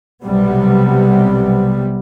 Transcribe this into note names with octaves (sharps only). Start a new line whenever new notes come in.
B1 C3 G3 B3